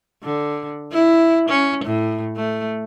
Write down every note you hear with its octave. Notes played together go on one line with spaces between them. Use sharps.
D3
E4
C#4
A2
A3